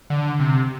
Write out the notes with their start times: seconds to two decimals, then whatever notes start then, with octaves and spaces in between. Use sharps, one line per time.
0.10 D3
0.40 C3